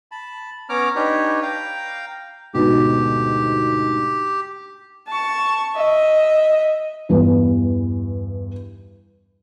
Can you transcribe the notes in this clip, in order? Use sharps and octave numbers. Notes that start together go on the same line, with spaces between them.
A5 B5
B3 C#4 C#5 A#5 D6 F6
D4 D#4 G4 B4 C#5
F5 G5 A#5
D2 G#2 B2 G4
A5 C#6
D#5 E5
E2 G2 E3